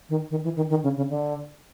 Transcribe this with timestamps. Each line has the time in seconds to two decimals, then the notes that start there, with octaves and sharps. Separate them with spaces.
0.09 D#3
0.31 D#3
0.44 E3
0.56 D#3
0.70 D#3
0.83 C#3
0.97 C#3
1.10 D3